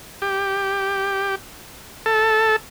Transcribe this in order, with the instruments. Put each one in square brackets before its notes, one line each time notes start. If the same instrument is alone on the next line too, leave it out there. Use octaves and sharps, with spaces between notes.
[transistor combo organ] G4
A4